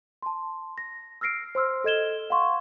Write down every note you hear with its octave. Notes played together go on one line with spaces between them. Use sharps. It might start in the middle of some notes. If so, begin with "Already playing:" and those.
A5 C6
A#6
E6 F6 A#6 C7 D7
C5 C6 E6 F6
A4 D#5 G#6 E7 G7
F5 F#5 C6 C#6